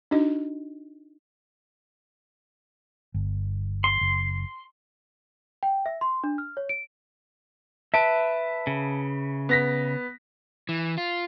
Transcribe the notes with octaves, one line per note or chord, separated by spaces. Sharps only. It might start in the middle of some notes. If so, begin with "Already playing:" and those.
D4 D#4 F#4 D#5
G1
C6
F#1
G5
E5
C6
D4
F6
C#5
D7
B4 E5 A5 D7
C#3
B3 A#6 B6
E3
F4